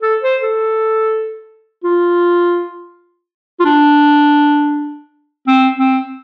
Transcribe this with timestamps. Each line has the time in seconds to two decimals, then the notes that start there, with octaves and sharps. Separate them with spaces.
0.02 A4
0.23 C5
0.42 A4
1.84 F4
3.60 F4
3.66 D4
5.48 C4
5.78 C4